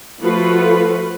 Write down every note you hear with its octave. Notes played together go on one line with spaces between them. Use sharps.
F3 A3 F4 F#4 B4